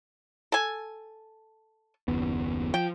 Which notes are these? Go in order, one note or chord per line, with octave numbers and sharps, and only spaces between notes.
A4 G#5
F#1 D#2 B3
F3 G5